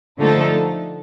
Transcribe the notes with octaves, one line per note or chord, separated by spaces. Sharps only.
D3 F3 A3 D#4 A4